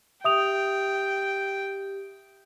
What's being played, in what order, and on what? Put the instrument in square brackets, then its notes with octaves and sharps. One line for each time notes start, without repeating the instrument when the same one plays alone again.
[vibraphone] G4 [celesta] E5 D#6 F7 [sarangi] G5